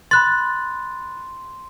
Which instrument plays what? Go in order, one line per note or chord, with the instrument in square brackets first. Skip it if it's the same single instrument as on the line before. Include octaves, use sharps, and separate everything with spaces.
[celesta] B5 F#6 A6 [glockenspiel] C6